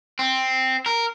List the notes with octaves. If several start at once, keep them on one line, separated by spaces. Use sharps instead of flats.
C4
A#4